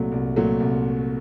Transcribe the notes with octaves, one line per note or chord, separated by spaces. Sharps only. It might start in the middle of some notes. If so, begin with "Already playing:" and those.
Already playing: C2 A#2 F#3 A3
C2
A#2 F#3 A3
C2